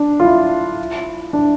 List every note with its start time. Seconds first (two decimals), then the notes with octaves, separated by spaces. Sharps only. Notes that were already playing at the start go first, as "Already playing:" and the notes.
Already playing: D4
0.20 F4
0.25 E4
1.33 D4